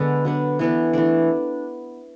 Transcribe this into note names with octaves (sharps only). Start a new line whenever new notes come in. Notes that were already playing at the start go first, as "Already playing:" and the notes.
Already playing: D3 G#3 B3 D4
F#3 B3 D4
E3 B3 D4
E3 A3 D4